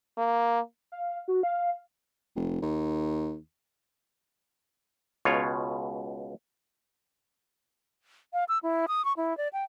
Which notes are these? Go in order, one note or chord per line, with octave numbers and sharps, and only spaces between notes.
A#3
F5
F#4
F5
F1
D#2
C#2 B2 F4 C#5
F5
E6
E4
D#6
C#6
E4
D5
G5